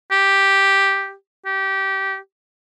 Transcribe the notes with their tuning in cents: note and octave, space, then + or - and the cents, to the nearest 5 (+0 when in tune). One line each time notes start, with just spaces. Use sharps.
G4 +0
G4 -20